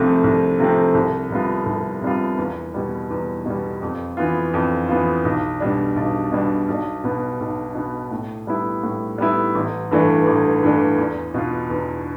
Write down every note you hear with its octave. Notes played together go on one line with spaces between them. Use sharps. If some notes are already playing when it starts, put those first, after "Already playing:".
Already playing: C2 C3 F3 A3 C4
C2
C3 F3 A3 C4
C2
C3 G3 B3 F4
C2
C3 G3 B3 F4
E2
B2 G3
E2
B2 G3
F2
E3 B3 F4
F2
E3 B3 F4
B1
B2 G3 D4
B1
B2 G3 D4
B1
B2 B3
B1
B2 B3
A2
G3 B3 E4
A2
G3 B3 E4
A1
G2 E3 A3 D4
A1
G2 E3 A3 D4
E2
B2 B3 F4
E2